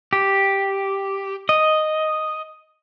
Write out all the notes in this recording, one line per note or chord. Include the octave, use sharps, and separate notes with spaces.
G4
D#5